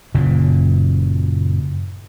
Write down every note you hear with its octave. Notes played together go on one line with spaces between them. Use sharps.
F#1 A#2 C#3